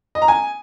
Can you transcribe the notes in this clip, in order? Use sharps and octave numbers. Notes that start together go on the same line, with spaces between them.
D#5
A#5
G#5